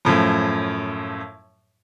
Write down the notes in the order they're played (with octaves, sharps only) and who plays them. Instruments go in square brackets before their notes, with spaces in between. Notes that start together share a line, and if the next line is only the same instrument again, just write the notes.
[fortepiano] F#2 A2 F3